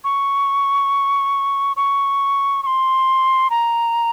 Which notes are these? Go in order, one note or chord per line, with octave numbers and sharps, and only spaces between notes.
C#6
C#6
C#6
C6
A#5